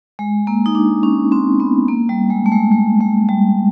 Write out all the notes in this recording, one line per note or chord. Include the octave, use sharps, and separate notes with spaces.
G#3
A#3
D#4
D4
C#4
C4
B3
A#3
G3
G#3
A3
G#3
G#3
G#3
G3